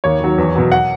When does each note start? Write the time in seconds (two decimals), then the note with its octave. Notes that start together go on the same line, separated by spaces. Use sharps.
0.04 D#2 C#5
0.21 D#3 F#3
0.38 E2
0.55 B2 F#3
0.72 F#5